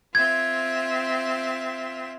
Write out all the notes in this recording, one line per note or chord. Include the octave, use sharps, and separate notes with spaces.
C4 F4 E5 G#6